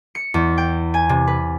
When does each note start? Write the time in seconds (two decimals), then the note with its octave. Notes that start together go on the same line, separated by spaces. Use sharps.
0.15 C#7
0.34 E2
0.58 G5
0.94 G#5
1.09 C3
1.27 B4